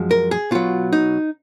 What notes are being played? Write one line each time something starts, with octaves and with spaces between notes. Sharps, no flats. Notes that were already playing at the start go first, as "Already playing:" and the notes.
Already playing: F#2 F3 G#3
A#4
G#4
B2 F#3 F4
D#4